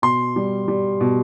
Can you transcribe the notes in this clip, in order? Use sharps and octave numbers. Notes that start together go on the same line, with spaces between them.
B2 C6
G3
G3
B2